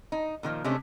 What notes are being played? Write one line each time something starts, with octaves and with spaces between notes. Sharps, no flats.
D#4
A#2 D3 D#3 F3
C3 G#3 A3 C#4 D4